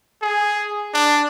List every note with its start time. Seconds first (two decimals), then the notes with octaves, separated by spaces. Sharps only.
0.22 G#4
0.94 D4